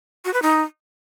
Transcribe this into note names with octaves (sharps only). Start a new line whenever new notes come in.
F#4
B4
D#4